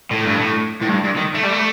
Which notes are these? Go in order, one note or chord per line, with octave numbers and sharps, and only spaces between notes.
A2
G2
A2
A2
G2
G2
D#3
A3
G3
A3